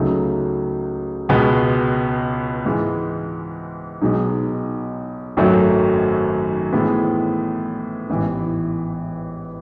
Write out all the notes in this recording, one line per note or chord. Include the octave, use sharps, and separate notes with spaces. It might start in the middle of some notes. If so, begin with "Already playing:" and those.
Already playing: C#2 C#3 F#3 A3 D#4
C#2 B2 G#3 B3
G#2 E3 G#3
B1 B2 G#3 D#4
G#1 F#2 D#3 F#3 A3
A2 E3 G#3 B3
A1 G#2 E3 B3